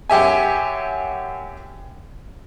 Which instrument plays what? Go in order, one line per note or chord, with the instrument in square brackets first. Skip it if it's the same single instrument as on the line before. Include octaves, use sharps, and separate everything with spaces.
[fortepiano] F#2 G4 E5 G#5